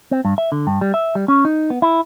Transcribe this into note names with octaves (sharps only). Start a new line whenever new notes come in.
C4
G2
E5
D3
G2
G3
E5
G3
C#4
D#4
B3
E4